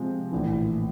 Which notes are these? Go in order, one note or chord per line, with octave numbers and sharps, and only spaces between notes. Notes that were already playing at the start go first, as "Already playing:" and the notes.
Already playing: C3 F3 G#3 C4 F4
A#1 A2 E3